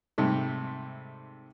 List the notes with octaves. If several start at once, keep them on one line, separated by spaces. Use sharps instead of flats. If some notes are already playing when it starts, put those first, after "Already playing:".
G#2 C3 G3 A3